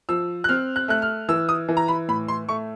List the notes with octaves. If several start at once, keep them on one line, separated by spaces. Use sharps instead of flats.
F3 E6
F#6
C4 F6
F#6
A3 F#6
F6
E3 E6
D#6
E3
A#5
B5
A2 B5
C6
A3 C#6